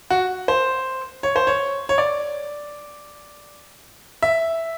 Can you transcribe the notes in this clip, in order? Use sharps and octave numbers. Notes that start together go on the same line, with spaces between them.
F#4
C5
C#5
C5
C#5
C#5
D5
E5